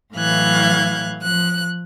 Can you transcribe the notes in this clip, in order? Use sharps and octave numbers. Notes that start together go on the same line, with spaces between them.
A2 E3 F#3 F5 F#6 G#6
F3 F#6